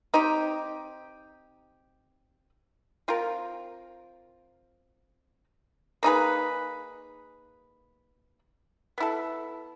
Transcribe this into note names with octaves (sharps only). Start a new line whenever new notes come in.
C4 D#4 G4
C4 F4 A#4
A#3 D#4 G#4 B4
B3 E4 A4